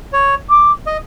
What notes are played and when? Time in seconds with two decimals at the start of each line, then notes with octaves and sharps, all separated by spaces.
0.13 C#5
0.49 D6
0.86 D#5